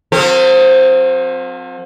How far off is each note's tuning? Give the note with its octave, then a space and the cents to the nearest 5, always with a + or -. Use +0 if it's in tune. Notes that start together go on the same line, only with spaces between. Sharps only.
F3 +45 C4 +0 A#4 -40